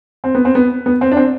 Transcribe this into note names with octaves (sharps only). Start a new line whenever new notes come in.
C4
B3
C4
B3
B3
C4
D4
C4